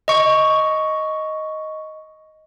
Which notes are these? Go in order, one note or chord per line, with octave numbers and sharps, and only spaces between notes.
D#5 C#6